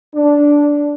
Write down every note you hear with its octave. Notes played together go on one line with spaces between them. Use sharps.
D4